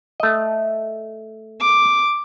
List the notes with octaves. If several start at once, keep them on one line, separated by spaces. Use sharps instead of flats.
A3 D#5
D6